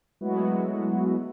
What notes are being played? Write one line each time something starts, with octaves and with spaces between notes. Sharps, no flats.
F#3 G#3 A3 B3 E4 F#4